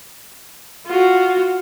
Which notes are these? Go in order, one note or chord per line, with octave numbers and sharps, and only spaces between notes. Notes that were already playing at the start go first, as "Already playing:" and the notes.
F4 F#4